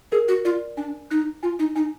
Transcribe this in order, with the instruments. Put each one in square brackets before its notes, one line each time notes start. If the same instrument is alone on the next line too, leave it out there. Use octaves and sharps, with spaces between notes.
[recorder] G#4 [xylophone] A#4
[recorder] F#4
[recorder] F4 [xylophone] D5
[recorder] D4 [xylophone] G#5
[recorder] D#4 [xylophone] F#6
[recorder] F4 [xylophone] G#5
[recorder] D#4
[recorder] D#4 [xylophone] G#5